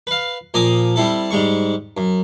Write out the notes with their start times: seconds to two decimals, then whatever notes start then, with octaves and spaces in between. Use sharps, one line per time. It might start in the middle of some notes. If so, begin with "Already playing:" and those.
0.07 B4 F5
0.54 A#2 F3 G#5 A#5 D6 D#6
0.96 G3 C4 E4 A4
1.31 G#2 G3 G#3 C#6
1.97 F#2